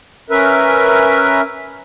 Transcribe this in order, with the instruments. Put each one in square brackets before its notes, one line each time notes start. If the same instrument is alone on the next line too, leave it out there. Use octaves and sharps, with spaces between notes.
[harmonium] C#4 A#4 B4 E5